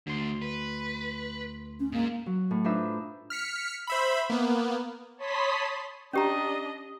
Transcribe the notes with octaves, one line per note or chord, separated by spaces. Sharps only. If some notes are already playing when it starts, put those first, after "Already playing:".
D2 D3 A3 C6
B4
C#4
G#2 G#3 A#3
F#3
A2
D4 D#4 F4 B4 C5 E5
F6 B6 C#7
C5 E5 B5
A#3 B3
C#5 A5 B5 C6 D#6 B6
C#4 D4 G4 D#5 A#5